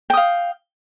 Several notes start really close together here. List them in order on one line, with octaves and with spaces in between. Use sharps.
G5 D#6 F5